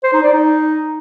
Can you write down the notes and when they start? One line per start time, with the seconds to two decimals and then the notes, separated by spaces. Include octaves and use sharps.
0.03 C5
0.13 D#4
0.23 D5
0.33 D#4